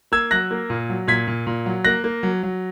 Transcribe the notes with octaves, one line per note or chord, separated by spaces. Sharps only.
A#3 E6 G#6
F#3 F#6 A#6
A#3
A#2
F#3
A#2 G#6 B6
A#2
A#2
F#3
A#3 F#6 A#6
A#3
F#3
F#3